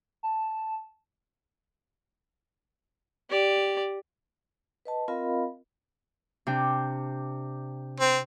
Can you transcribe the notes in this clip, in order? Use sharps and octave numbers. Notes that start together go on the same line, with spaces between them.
A5
G4 D5
B4 D#5 A5
C4 F4 A#4 D#5 F5 B5
C3 D4 G5
C4